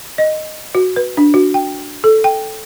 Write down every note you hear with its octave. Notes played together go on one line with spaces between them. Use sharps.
D#5
F#4
B4
D4
F#4
G5
A4
G5